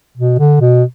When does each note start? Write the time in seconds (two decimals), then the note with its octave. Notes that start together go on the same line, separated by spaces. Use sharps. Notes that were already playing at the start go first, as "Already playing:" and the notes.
0.17 B2
0.39 D3
0.61 B2